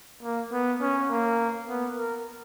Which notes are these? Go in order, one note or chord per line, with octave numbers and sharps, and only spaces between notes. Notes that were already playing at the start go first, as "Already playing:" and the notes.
A#3
B3
C#4
A#3
B3
A#4